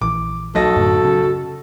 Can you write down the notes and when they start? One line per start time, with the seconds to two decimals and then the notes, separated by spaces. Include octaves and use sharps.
0.02 A#1 E3 D6
0.55 B1 F#4 A4 D#5 A#6
0.76 F#2 A2 D3
1.04 C#3